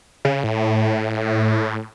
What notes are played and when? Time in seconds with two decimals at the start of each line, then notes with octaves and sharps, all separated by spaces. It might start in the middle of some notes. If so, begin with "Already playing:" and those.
0.25 C#3
0.44 A2